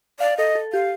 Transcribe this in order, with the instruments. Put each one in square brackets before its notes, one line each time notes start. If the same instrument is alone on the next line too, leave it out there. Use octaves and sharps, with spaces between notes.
[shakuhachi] D5 [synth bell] F5
[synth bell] A4 [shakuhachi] D#5
[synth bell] A4
[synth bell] G4 [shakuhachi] F5